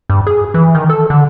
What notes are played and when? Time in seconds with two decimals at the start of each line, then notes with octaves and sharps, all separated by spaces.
0.09 G2
0.27 G#4
0.54 E3
0.75 D#3
0.89 A4
1.10 D3